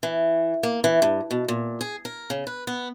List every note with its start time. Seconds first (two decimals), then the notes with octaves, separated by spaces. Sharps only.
0.03 E3
0.63 A#3
0.84 E3
1.02 G2
1.31 B2
1.48 A#2
1.81 G#4
2.05 A#4
2.30 C#3
2.47 B4
2.67 B3